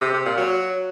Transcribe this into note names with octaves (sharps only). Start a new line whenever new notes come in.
C3
C3
A#2
F#3